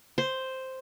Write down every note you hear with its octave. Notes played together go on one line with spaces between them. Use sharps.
C5